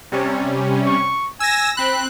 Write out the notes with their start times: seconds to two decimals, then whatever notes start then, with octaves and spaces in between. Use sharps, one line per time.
0.12 C3 G3 C#4
0.86 C#6
1.40 G#5 E6 A#6
1.77 C4 B5 F#6